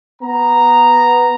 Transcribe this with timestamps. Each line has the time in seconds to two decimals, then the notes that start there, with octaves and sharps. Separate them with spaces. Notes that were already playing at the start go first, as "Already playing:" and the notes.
0.22 B3 A#5